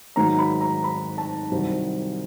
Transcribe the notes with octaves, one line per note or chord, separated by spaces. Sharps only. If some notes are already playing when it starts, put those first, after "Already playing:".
G#2 D#3 F#3 A#5
B5
A#5
B5
A5
C2 C3 D#3 F#3